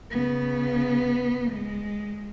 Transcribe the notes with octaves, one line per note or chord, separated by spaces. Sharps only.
C#3 B3
G#3